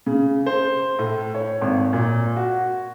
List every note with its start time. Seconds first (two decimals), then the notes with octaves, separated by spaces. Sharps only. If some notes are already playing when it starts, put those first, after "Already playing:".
0.06 C#3
0.46 C5
0.99 A2
1.35 C#5
1.61 G#1
1.93 A#2
2.36 F#4